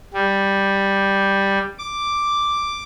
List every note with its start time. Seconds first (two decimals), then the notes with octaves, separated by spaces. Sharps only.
0.13 G3
1.78 D6